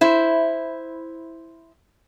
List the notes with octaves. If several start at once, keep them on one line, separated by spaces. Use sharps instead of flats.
E4 C5